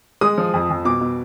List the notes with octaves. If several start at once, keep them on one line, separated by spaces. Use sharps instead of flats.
G#3 D#6
F3
F2
F2
B2 D6
B2